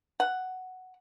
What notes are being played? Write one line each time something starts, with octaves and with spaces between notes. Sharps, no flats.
F#5